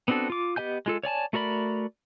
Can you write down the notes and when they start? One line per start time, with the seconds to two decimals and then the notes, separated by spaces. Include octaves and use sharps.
0.08 B3 C4 D4 F#4 A4
0.30 F4 D6
0.56 B3 G4 D#5 G#5 G6
0.86 G#3 F4 A4
1.03 C#5 D5 G#5 A5
1.33 A3 F#4 A#4 D5 B5